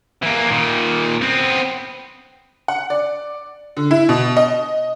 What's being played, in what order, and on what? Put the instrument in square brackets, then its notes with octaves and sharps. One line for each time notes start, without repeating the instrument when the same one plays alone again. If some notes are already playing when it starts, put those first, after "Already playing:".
[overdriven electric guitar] E3 A#3
A#2 D#3
B3 C4
[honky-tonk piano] F#5
D5
D3
E4
B2
D#5